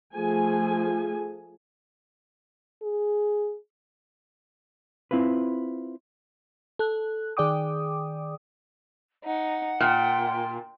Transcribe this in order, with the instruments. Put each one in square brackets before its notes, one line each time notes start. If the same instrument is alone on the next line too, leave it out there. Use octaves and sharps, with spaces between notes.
[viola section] F3 A3 G#4 G#5
[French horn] G#4
[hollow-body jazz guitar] C4 E4 F4 B4
[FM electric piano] A4 F#6
D#3 G#4 D5 G5 D6 D#6
[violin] D#4 [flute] F#5
[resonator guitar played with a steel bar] A#2 [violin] G5